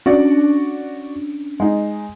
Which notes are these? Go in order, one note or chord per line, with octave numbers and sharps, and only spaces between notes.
C#4 D4 F#4 D5
G#3 D#4